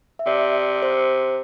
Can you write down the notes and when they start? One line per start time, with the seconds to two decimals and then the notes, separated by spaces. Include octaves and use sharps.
0.19 E5
0.26 C3 D5
0.82 C5